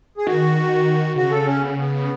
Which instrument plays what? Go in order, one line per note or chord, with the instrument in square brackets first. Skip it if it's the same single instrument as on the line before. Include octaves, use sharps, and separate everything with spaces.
[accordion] G#4
[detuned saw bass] D#3 [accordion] F#4
[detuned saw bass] C#3 [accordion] F#4
[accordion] A4
C#4
B3
B3